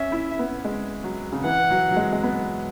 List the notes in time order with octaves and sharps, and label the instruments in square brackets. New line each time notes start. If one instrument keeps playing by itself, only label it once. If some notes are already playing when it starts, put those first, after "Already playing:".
Already playing: [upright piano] C#4 [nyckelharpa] E5
[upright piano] E4
B3
G#3
F#3
C#3
[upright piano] E3 [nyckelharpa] F#5
[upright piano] F#3
F#3
G#3
G#3
B3